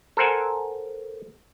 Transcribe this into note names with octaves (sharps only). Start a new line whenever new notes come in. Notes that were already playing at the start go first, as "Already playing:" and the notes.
A4 A#4 C5 F#5 G#5